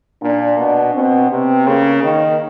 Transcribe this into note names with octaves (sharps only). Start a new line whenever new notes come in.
A#2 D4
B2
B2 C4
C3 B3
C#3 A#3
D#3